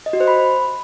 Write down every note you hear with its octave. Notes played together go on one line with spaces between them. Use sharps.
D#5
F#4
C5
B5